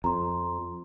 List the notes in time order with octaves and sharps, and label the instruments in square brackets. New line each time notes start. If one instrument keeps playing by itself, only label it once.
[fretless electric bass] F2 [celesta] A#5 C6